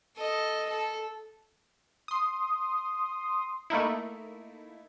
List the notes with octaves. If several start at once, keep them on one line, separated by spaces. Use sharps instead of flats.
A4 D#5
A4
C6 D#6
A3 A#3 D#4 E4